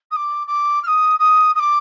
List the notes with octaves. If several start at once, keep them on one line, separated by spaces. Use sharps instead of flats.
D#6
D6
D6
F6
D#6
D#6
D#6
D6